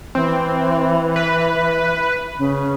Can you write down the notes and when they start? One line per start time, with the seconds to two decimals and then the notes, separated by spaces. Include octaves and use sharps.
0.15 E3 C4
1.16 B4
2.39 C#3